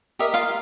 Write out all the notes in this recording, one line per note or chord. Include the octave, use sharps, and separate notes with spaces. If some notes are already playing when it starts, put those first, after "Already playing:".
G4 A#4 D#5 E5
F4 F5